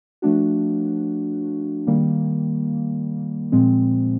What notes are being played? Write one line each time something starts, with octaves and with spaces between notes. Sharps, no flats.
F3 A3 D4 F#4
D#3 G3 A#3
A#2 F3 G#3 C4